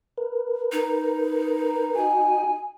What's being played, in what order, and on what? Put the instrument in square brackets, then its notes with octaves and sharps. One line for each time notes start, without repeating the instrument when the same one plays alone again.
[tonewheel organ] A#4 B4
[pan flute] D#4
[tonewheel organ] F#4 D#5 G5 [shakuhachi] G#5